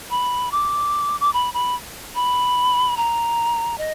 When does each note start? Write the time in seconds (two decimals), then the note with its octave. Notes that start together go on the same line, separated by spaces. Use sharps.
0.10 B5
0.52 D6
1.20 D6
1.33 B5
1.54 B5
2.15 B5
2.97 A#5
3.78 D#5